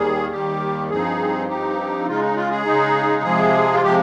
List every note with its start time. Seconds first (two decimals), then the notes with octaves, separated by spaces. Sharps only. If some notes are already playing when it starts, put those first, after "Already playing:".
Already playing: D#2 D#3 G3 G#4
0.31 D#2 D#3 G3 G4
0.90 G2 F3 C4 D#4 G#4
1.48 G2 F3 C4 D#4 G4
2.06 C#3 G#3 D#4 F4
2.22 D#4
2.36 F4
2.50 G#4
2.65 C#3 G#3 D#4
3.23 C3 F3 G#3 G#4
3.73 F4
3.82 C3 F3 G#3 G4